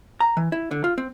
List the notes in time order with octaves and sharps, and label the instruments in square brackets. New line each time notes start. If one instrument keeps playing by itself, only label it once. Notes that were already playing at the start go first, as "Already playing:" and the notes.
[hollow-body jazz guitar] A#5
E3
E4
D3
F4
C4